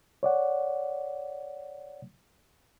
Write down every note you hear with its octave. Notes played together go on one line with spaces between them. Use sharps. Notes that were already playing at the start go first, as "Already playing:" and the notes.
C#5 D5 F#5